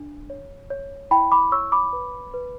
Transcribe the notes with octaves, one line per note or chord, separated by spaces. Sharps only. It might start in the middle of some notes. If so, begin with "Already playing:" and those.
Already playing: D4
C#5
C#5
E4 G5 B5
B5 D6
C#5 C#6 E6
B5 D6
B4
B4